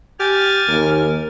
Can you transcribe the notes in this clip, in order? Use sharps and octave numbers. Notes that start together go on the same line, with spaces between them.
G4 G#5 F6 A6
D#2 A#4